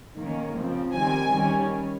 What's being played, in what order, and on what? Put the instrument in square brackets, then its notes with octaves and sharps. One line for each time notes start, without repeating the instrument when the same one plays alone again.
[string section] D#3 A#3 C#4
C#3 F3 C4
D#3 G3 C4 G#5
D#3 G3 C#4